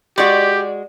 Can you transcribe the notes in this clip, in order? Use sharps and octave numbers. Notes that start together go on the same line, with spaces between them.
G#3 F#4 G4 D5